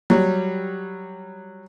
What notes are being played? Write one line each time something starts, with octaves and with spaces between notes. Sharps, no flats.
F#3 G3